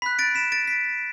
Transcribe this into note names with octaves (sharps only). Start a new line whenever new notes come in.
B5 F#6 B6
A6 D7
B6 E7
A6 D7
B6